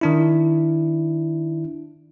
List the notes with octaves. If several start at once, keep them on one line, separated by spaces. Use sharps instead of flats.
D#3 D4 E4